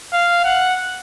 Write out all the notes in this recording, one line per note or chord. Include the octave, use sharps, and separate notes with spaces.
F5
F#5